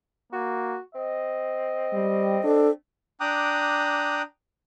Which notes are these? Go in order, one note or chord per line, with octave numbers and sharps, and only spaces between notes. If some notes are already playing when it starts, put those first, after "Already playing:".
A#3 F#4
C4 D#5
G3
C4 D4 A4
D4 G5 A#5 D6 D#6 F#6